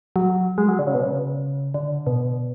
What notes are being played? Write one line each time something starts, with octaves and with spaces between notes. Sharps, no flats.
F#3
G#3
F#3
D3
C#3
B2
C#3
D3
B2